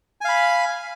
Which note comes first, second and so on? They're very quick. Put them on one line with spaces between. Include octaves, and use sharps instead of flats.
G#5 F5 B5